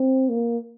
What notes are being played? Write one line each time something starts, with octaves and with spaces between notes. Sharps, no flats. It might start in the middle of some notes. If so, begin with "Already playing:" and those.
Already playing: C4
A#3